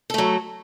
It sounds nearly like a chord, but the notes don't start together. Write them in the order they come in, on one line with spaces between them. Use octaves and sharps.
A4 A3 F#3